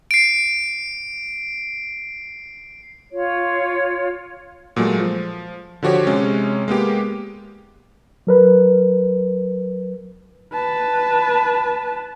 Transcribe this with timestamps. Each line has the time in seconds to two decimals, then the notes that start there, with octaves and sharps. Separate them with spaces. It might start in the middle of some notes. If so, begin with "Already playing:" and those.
0.11 C7 D7
3.12 F4 C#5
4.76 A#2 F#3 G#3 A3
5.00 F3
5.82 D3 F3 F#4 G4 C#5
6.07 C3 G#3 C#4
6.68 G#3 A#3 B3 G4
8.27 F#3 A#4 B4
10.53 B4 A5